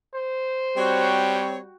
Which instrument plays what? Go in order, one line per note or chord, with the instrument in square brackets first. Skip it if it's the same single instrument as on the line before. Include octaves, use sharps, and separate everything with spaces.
[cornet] C5
[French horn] G3 [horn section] C4 C#5 [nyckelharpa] F#4 G5